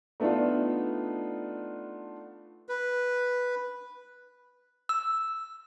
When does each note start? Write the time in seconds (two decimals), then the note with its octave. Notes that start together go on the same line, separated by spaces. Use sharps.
0.20 A3 B3 D4 D#4 F4
2.69 B4
4.89 E6